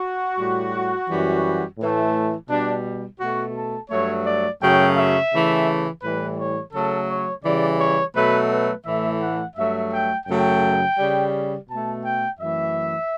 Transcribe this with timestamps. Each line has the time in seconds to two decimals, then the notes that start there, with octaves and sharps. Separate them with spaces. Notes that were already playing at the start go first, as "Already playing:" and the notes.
Already playing: F#4
0.37 A2 G3
1.08 F#2 E3 G3
1.79 A2 E3 A3
2.49 B2 G3 D4
3.20 B2 A3 F#4
3.55 A4
3.90 G2 F#3 A3 C#5
4.26 D5
4.61 F#2 C#3 F#3 A3 G5
4.97 E5
5.32 C#3 E3 A3
6.02 A2 E3 G3 B4
6.38 C#5
6.73 C#3 F#3 A3 A4
7.08 C#5
7.44 C#3 E3 G3 D5
7.79 C#5
8.15 B2 F#3 A3 B4
8.50 B4
8.85 A2 E3 A3 E5
9.21 F#5
9.56 G2 F#3 A3 E5
9.92 G5
10.26 F#2 C#3 F#3 A3 G5
10.97 C#3 G3
11.68 B2 A3 A5
12.04 G5
12.39 F#2 E3 A3 E5